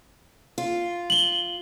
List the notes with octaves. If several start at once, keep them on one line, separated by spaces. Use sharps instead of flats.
F4
F#7 G7